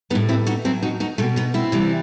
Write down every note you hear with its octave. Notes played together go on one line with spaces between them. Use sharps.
A2 G3 B3 D#4
C4 E4
D#4 F#4
B2 F#3 C4 E4
D#4 F#4
D#4 F#4
B2 G3 A3 C4
B3 D#4
C4 E4
C3 E3 G3